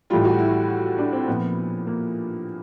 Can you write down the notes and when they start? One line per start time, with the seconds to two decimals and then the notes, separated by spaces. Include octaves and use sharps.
0.10 A2 E3 G3 F4
0.25 F#4
0.39 E4
0.98 D4
1.13 C4
1.27 A#2 F3 B3
1.87 A#3